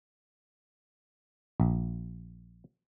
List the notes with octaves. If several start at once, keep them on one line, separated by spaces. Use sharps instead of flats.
A#1